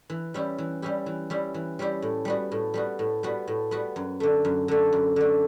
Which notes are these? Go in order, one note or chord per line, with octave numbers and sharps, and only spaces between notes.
E3
G3 C#4 E4 G4
E3
G3 C#4 E4 G4
E3
G3 C#4 E4 G4
E3
G3 C#4 E4 G4
A2
G3 B3 F#4
A2
G3 B3 F#4
A2
G3 B3 F#4
A2
G3 B3 F#4
F#2
D3 A3
F#2
D3 A3
F#2
D3 A3